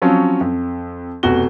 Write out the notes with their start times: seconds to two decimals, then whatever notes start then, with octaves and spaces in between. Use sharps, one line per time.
0.02 F3 F#3 C4 C#4
0.41 F2
1.23 F1 B2 F#4 G7